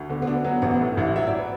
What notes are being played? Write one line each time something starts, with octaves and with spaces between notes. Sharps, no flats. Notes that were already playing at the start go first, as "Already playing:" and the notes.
Already playing: D2
D3 B3
B3
D4 F#4
F#3 B3
A1 B3
A2
A1 E4
F#3 E5
D5
B4